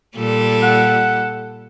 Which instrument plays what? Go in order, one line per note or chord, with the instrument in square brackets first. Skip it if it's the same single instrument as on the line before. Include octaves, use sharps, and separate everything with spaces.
[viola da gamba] A#2 G3 A4
[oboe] F#5